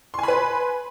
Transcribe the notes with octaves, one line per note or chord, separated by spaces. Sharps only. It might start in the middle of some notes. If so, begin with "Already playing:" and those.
B4 G#5 B5 C6